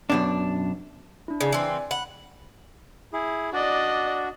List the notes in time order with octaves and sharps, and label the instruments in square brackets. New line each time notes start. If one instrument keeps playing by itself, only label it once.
[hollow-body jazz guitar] F#2 B2 D4
[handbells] D4 E4
[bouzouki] C#3 [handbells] D5 G#5
[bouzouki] E3 C4
[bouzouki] F#5 [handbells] B5
[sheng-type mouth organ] E4 G#4
[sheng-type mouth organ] D4 F#4 [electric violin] D5 D#5